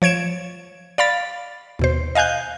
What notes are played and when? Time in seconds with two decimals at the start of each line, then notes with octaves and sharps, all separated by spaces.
0.02 F3 C#5 G#6 D7 E7
0.98 D5 F5 B5 A6
1.79 D#2 B2 C5
2.15 D#5 F5 G#5 F#6 G6